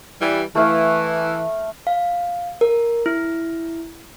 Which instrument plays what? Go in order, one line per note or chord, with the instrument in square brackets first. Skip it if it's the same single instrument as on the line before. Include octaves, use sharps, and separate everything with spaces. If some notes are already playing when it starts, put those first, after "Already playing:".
[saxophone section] E3 G3
[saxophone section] E3 [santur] A3 F5
[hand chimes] F5
A#4
E4